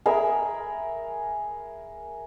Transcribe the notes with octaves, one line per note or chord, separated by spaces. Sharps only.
G#4 A#4 E5 B5